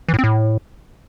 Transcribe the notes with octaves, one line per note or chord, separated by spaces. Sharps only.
E3
A2
C4
A2